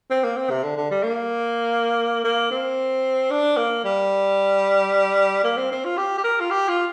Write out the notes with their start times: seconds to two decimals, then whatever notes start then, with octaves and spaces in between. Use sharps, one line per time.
0.11 C4
0.24 A#3
0.37 C4
0.50 C3
0.63 D3
0.77 D3
0.91 G3
1.03 A#3
2.24 A#3
2.51 C4
3.31 D4
3.57 A#3
3.85 G3
5.44 A#3
5.57 C4
5.72 C4
5.85 F4
5.97 G4
6.17 G4
6.24 A#4
6.40 F4
6.51 G4
6.68 F4